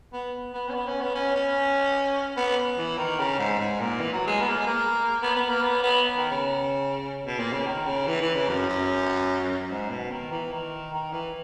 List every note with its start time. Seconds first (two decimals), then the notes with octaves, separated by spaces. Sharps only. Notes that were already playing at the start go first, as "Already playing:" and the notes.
0.13 B3
0.54 B3
0.69 C#4
0.74 B3
0.87 C#4
1.01 B3
1.14 C#4
1.35 C#4
2.37 B3
2.78 E3
2.98 D#3
3.19 C#3
3.39 G#2
3.59 G#2
3.80 A#2
4.00 E3
4.13 F#3
4.27 G#3
4.41 B3
4.49 A#3
4.58 G#3
4.67 A#3
5.22 B3
5.36 B3
5.49 A#3
5.63 B3
5.83 B3
6.17 D#3
6.31 C#3
7.26 B2
7.39 A#2
7.53 C#3
7.66 D#3
7.87 C#3
8.07 E3
8.21 E3
8.35 C#3
8.49 F#2
8.69 F#2
9.71 G#2
9.91 B2
10.11 D#3
10.31 E3
10.52 D#3
10.93 D#3
11.12 E3